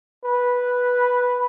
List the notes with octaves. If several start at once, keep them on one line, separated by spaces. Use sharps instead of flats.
B4